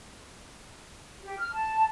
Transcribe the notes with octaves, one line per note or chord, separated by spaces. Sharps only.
G4
F6
A5